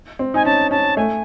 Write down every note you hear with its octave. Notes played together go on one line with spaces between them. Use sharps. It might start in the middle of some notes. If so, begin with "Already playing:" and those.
C4
D#4 G#5
C#4 A5
C#4 A5
A3 G#5